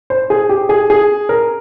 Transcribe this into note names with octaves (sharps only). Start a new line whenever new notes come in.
C5
G#4
G4
G#4
G#4
A#4